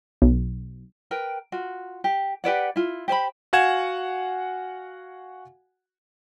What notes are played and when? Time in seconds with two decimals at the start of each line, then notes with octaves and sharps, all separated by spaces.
0.22 B1
1.11 A#4 B4 G5
1.52 F4 F#4
2.04 G4
2.44 G4 B4 D5 F#5
2.76 E4 F4
3.08 G4 C5 G#5 B5
3.53 F#4 F5 F#5 G#5 G#6 E7